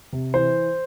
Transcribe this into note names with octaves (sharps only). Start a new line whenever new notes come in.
C3
E3 C5